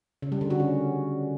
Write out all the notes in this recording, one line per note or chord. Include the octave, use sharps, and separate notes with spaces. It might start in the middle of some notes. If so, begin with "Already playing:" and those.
C#3
G3
D3
F#4
C#4